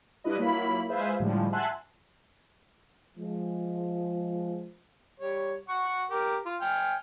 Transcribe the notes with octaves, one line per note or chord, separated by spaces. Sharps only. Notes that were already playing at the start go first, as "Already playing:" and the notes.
G3 D4 E4 F4 B4 D#5
F#3 A#3 E4 F4 B5
G#3 F4 G#4 B4 C5 E5
A2 D3 F3 G3 G#3
E5 F#5 G#5 A5 C6 F#6
F3 G#3
G3 C#5
F#5 C#6
G4 A#4
F4
G5 G#5 F6